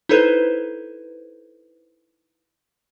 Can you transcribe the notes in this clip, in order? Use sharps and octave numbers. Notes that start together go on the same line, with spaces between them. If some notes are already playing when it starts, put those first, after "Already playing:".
D#4 E4 A4 B4 C5